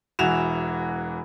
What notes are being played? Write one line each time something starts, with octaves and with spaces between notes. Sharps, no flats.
E1 E3 F#4 E7 F7